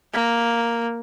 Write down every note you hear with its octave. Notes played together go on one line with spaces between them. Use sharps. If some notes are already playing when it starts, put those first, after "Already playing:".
A#3